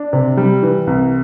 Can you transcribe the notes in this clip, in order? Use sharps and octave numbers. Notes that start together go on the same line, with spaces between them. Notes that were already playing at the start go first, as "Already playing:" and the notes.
Already playing: D4
C3
G3
E3
C2